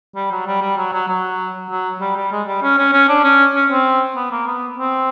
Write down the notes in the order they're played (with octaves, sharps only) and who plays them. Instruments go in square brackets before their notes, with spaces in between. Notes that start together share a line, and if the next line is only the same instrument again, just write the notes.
[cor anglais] G3
F#3
G3
G3
F#3
F#3
F#3
F#3
G3
G3
G#3
G3
C#4
C#4
C#4
D4
C#4
C#4
C4
B3
A#3
B3
C4